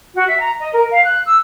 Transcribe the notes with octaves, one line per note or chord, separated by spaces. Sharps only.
F#4
E5
A#5
D#5
A#4
F5
F#6
E6